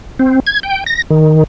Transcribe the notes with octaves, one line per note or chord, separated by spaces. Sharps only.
C4
G#6
G5
A#6
D#3